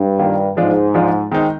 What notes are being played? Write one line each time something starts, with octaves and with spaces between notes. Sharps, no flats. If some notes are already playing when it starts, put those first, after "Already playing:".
Already playing: G2
D#3 A#3 F4
G#2 F3 G#3 D4 F4
F3 G#3 D4 F4
D#3 G#3 C4 D#4